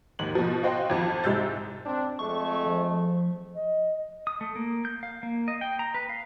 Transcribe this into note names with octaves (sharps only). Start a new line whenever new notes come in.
D#2 G#2 F#7
B2 F3
F4 F#4 C5 D#5 G5 C6
G#1 F2
C2 G#2 G#3 E6 G6 A6
C4 D4
F2 G#3 A3 C#6
F3
D#5
D#6
A3
A#3
G6
F5
A#3
D#5
G5
A#5
B4
F5